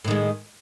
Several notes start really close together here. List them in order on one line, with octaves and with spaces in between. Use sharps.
A2 D#3 G#3